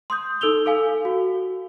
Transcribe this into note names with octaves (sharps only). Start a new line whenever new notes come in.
C6 D#6 G6
D#4 A4 E6 F7 G7
A4 F5 G#5
F#4